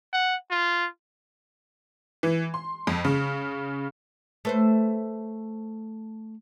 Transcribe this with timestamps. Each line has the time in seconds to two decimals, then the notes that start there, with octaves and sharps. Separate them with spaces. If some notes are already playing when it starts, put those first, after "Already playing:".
0.13 F#5
0.50 F4
2.23 E3
2.54 C6
2.87 F2
3.05 C#3
4.45 A3 B4 C5